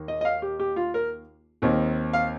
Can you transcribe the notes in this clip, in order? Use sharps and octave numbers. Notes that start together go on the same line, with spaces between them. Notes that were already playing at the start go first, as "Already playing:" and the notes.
Already playing: D#2 D#3 A#3
D#5
D#5
F5
G4
G4
F4
A#4
D#2 D#3 C4
F5